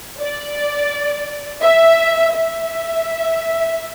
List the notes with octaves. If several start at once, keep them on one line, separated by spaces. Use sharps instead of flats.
D5
E5
E5